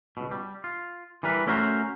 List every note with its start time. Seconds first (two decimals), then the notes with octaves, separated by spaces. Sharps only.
0.17 C#2 B2
0.31 G3
0.64 F4
1.23 E3 G3 A#4 B4
1.47 A3 C#4 E4 F#4 A#4 C5